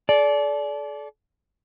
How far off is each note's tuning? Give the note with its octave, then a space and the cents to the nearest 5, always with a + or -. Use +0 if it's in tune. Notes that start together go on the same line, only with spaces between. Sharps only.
A4 -40 D5 -20